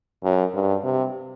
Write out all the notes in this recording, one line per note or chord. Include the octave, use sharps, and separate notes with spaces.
F#2
G2
C3